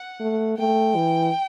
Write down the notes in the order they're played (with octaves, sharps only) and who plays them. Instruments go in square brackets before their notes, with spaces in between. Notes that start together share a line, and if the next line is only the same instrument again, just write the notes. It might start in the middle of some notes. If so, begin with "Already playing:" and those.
Already playing: [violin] F#5
[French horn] A3
[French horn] A3 [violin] G5
[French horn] E3